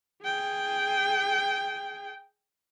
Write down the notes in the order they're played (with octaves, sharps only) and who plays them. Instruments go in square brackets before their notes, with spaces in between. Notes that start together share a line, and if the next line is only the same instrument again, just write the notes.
[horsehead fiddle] G#4 G5